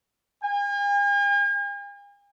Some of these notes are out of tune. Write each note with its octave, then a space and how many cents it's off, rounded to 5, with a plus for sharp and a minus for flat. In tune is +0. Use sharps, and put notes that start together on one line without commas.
G#5 -45